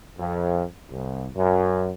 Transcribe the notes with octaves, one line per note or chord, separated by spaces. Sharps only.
F2
C2
F#2